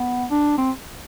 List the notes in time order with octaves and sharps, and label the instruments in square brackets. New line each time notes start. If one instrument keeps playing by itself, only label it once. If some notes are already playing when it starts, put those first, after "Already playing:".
Already playing: [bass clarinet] B3
D4
C4